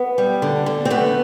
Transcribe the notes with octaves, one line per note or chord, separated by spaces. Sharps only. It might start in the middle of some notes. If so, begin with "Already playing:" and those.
Already playing: B3
G3
D3
D3
C4
A3 B3